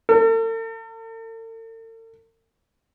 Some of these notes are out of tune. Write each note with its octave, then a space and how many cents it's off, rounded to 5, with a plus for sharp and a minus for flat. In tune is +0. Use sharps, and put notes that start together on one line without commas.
A4 +45